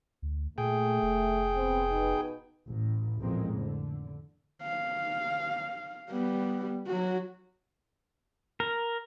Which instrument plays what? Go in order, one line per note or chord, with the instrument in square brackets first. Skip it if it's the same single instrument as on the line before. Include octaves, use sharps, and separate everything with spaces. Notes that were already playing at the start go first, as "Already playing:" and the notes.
[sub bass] D2
[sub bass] A#2 [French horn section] A3 [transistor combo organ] G#4 G5
[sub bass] F1
[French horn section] B3 C4
B2 D#4 B4
[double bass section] A1 A2
A1 F2 A#2 G#3 A#3 C4
D3
[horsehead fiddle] F5
G3 B3
F#3 F#4
[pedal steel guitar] A#4